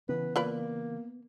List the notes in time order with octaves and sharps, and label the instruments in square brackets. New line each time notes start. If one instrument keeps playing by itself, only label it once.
[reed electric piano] C#3 E3 [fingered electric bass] B3 [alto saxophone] B4
[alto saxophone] A#3 [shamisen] F4 B4 D5